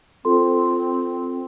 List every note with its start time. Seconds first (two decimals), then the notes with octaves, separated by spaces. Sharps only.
0.25 C4 F4 A4 C6